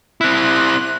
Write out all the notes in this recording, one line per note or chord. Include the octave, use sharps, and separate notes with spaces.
C4 E4 F#6